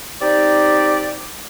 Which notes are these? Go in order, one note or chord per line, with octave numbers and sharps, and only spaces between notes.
C4 D#4 G4 D5